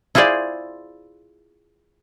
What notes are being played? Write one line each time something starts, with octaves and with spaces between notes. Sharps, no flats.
E4 F4 G#4 C5 D5